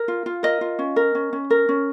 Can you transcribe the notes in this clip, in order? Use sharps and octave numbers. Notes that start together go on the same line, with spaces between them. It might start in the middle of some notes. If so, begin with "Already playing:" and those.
Already playing: A#4
F4
F4
A#4 D#5
F4
C#4
A#4
C#4
C#4
A#4
C#4